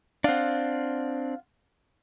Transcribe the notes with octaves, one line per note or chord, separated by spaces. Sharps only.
C4 D4 F4 F#5